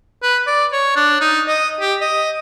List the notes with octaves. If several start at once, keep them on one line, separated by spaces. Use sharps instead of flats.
B4
D5
C#5
D4
D#4
D#5
G4
D#5